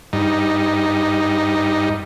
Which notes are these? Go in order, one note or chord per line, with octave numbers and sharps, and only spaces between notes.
G2 D#4